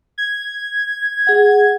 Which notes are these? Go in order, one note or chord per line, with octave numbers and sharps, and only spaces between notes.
G#6
G#4 F#5